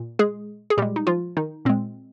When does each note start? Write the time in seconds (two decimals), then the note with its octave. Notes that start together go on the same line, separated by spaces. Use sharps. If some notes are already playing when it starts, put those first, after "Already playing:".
Already playing: A#2
0.19 G#3 G#4
0.70 G#4
0.77 A#2 G3 G#3 G4
0.96 D#4
1.07 F3 F4
1.37 D#3 D#4
1.65 A#2 G#3 C4